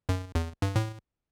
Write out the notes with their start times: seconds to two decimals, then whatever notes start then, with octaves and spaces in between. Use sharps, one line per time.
0.09 F#2
0.35 E2
0.62 G2
0.76 A2